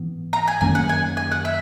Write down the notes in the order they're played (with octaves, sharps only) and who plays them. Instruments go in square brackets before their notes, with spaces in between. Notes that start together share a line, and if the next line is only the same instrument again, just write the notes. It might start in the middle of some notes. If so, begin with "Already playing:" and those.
Already playing: [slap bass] G#2 E3 B3
[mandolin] A#5
G#5
[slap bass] F#2 D#3 A#3 C#4 [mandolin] G#5
[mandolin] F#5
G#5
G#5
F#5
E5